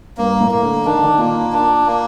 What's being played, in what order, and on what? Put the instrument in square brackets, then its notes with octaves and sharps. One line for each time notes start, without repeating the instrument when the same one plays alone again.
[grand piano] G2 [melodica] A#3
[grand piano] A2
[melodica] A#3
[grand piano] D3
[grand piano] D#3 [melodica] D4
[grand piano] D3
D#3
[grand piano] A#2 [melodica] A#3
[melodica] D4
A#3